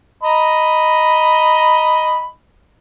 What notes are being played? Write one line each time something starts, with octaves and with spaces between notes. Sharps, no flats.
D#5 A#5 B5